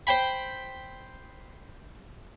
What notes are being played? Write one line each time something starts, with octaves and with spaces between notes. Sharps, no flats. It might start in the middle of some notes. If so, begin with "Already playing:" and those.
C5 G5 B5